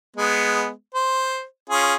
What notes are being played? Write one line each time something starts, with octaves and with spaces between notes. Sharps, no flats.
G#3 B3
C5
C#4 F4 G#4